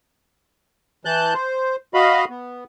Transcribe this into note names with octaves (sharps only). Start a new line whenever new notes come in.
E3 A5 F#6 G6
C5
F#4 D#5 F5 B5
B3